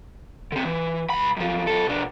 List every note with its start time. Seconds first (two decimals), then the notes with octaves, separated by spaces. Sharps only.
0.52 D3 C4
0.65 E3
1.10 C#2 B5
1.37 F#2 F3
1.67 F#2 A4
1.87 B2 D4